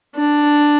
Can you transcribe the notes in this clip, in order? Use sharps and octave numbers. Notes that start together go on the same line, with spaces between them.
D4